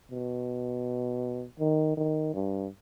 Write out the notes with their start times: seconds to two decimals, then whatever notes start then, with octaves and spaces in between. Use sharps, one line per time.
0.11 B2
1.60 D#3
1.97 D#3
2.34 G2